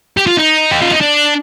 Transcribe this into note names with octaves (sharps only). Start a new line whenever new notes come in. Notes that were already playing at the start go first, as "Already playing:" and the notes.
G4
F4
D#4
G4
F4
D#4
D4